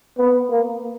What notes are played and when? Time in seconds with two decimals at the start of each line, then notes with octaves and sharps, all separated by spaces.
0.18 B3
0.50 A#3